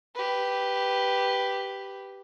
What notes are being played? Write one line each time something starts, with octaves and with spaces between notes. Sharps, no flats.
G4 B4